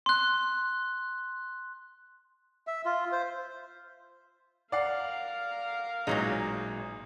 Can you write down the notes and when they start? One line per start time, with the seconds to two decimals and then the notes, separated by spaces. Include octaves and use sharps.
0.06 C6 F#6
2.67 E5
2.85 F4
3.12 C5
4.72 A#4 D5 F5 F#5 C7
6.07 A1 A#2 F#3 G#3 D#4 F7